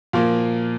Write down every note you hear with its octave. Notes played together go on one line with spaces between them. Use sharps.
A#2 F3 A#3 F5